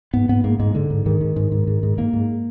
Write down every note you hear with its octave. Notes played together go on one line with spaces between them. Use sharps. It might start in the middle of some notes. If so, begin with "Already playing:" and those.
G#2 B3
G#2 B3
G#2 A#3
G#2 G#3
G#2 D3
G#2
G#2 D#3
G#2
G#2
G#2
G#2
G#2
G#2 A#3
G#2